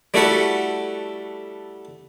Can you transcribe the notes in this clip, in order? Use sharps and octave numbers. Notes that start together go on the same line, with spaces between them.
G3 A3 E4 F#4 A4 F#5